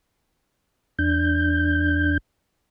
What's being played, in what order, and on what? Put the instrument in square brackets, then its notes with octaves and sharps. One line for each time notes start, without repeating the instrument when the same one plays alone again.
[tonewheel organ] E2 D4 G6